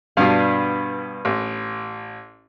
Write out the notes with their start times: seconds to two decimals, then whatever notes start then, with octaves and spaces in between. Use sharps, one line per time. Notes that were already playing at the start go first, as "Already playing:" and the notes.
0.17 G2 B2 B3 D4 F5
1.25 A1